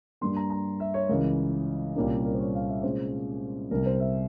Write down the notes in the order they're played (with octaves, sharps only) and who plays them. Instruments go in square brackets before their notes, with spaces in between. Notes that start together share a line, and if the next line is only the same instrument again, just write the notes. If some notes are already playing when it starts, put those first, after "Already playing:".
[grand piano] G2 G3 A#3 C6
A#5
A#5
E5
C#5
C#2 C#3 E3 A#4
C2 A#2 G3 A#3 C#4 A#4
A#4
C5
C#5
F5
E5
C2 A#2 G#3 C#4 C5
C2 C3 G3 A#4
C5
E5